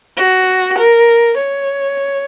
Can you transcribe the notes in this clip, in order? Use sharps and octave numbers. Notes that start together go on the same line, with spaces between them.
F#4
A#4
C#5